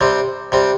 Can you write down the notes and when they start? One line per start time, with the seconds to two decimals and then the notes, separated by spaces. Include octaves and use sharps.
0.01 C3 G3 C4
0.52 C3 G3 C4